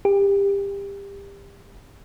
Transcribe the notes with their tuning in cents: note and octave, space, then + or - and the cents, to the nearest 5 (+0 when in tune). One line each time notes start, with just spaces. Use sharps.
G4 +25